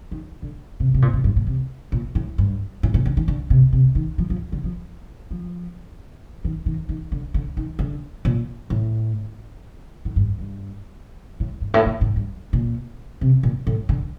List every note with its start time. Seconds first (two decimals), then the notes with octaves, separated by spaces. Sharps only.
0.12 D#3
0.42 D3
0.80 C3
0.94 C3
1.02 A#2
1.14 C3
1.24 G2
1.36 A#2
1.47 C3
1.92 A#2
2.15 A2
2.38 G2
2.83 A2
2.94 A#2
3.06 D3
3.17 D#3
3.28 D3
3.50 C3
3.73 C3
3.95 D#3
4.18 F3
4.30 F3
4.52 D3
4.64 F3
5.31 F3
6.45 D#3
6.66 D#3
6.89 D#3
7.12 D3
7.34 D3
7.57 D#3
7.79 D3
8.25 A#2
8.70 A2
10.05 A2
10.16 G2
10.38 G2
11.40 A2
11.61 G2
11.74 A2
11.86 A#2
12.01 A2
12.16 G2
12.53 A#2
13.21 C3
13.43 A#2
13.67 A2
13.89 D3